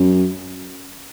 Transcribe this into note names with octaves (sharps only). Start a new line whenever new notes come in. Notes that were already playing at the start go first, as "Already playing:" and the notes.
Already playing: F#2